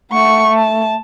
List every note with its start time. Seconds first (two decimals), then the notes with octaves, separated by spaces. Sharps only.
0.11 A3 F#5 C#6
0.54 A5